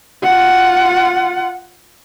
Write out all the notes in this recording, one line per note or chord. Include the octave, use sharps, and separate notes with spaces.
F4 F#5